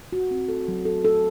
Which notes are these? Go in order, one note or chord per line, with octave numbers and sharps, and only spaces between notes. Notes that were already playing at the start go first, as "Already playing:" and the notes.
F#4
C4
A4
F#3
A4
A4